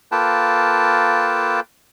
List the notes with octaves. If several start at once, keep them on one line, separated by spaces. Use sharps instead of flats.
A#3 F4 A4 B4 G5 A5